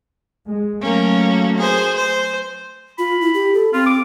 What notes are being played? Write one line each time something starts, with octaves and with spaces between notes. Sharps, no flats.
G#3
F#3 A3 A#3 C#4
G#4 C5
C5
F4 B5
E4
G4
A4
C4 F4
D6